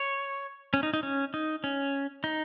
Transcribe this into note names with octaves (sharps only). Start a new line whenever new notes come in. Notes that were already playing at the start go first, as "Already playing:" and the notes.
Already playing: C#5
C#4
D#4
D#4
C#4
D#4
C#4
D#4